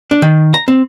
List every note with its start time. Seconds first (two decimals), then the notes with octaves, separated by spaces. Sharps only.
0.11 D4
0.22 D#3
0.54 A#5
0.68 C4